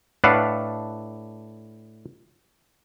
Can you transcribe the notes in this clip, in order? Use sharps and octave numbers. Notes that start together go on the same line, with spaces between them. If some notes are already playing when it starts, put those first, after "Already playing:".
A2 D4 A4 B4 F5 F#5